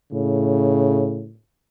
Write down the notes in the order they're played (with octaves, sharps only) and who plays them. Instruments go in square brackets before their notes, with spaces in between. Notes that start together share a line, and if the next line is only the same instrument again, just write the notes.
[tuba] A2 [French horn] C#3